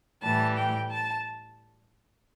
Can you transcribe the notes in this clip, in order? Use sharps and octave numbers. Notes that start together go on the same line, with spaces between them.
A2 E3 G3 A5
G5
A5